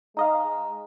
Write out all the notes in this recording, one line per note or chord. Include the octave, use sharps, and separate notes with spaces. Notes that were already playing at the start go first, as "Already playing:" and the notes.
G#3 D#4 D#5 F5 A#5